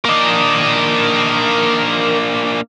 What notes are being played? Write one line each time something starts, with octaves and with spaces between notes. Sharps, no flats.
A#3 D4 A#4 D#5